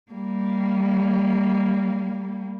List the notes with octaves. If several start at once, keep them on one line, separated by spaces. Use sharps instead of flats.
G3 A#3